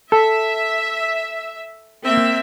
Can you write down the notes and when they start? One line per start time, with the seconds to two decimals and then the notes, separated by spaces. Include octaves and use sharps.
0.12 A4 E5
2.03 A#3 C4 E5